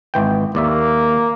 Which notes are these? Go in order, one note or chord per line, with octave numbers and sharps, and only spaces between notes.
G#1 E3 G5
D#2 A#3 D5 E5